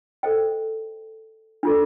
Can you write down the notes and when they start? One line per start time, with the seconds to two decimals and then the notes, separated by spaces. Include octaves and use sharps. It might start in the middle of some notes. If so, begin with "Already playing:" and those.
0.23 A4 C5 D#5 G5
1.63 D4 F4 A4